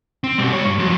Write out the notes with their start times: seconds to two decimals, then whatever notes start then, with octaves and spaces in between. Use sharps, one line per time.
0.24 C4
0.38 B2 G3
0.52 C#2 C#5
0.65 G2
0.78 F2 F#3